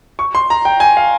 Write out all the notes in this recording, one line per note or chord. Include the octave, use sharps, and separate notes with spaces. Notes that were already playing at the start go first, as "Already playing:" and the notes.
C#6
C6
A#5
G5
G#5
F5